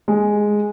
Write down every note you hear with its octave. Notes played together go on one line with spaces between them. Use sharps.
G#3